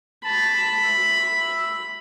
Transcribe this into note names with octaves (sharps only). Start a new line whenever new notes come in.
A5 B5
E5